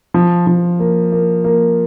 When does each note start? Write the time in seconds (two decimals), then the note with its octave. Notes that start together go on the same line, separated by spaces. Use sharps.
0.14 F3
0.47 F3
0.79 A#3
1.12 A#3
1.44 A#3